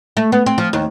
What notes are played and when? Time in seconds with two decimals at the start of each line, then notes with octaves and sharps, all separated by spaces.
0.17 A3
0.32 B3
0.46 C4
0.58 F3
0.73 D#2